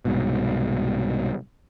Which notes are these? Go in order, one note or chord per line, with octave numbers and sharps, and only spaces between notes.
C2 G#2 B2